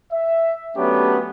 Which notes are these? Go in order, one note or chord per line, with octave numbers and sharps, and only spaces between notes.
E5
F#3 A3 B3 C#4 D4 G4